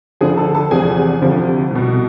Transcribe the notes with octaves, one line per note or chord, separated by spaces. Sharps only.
D2 D3 F3 G#4 G#5
A4 A5
A4 A5
E2 C3 F3 G#4 G#5
D2 C3 F3
C2 B2